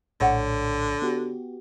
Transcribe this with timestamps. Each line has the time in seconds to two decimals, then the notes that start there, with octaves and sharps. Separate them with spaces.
0.21 A#1 A2 D3 C#5 F#5
1.02 B3 F#4 G4